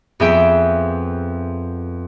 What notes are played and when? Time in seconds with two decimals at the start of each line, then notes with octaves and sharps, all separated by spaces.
0.20 F2 B3 G#4 E5 G5 D7